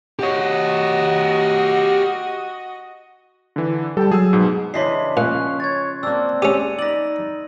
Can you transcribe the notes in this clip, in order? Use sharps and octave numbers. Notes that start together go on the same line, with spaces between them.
F#4 G4 C#5 D#5
D3 E3
G3 A4 G5 A5
F#3 G#4 E6
G#2 B2
C#3 E3 G#3 D4 C6 B6 C7
A#2 F3 C#4 F#6
C#5 G#6 A6
A#3 C4 D4 E6
C#4 G4 E6 D#7
D#4 B4 D5 A#6 F#7